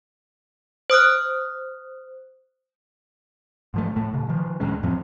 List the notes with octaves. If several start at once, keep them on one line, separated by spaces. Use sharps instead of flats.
C5 D#6 F6 F#6
G#2 F3 A3
A2 A3
A#2 C#3
D#3 F3
D2 A2 G#3 C#4
F2 A2 F3 C4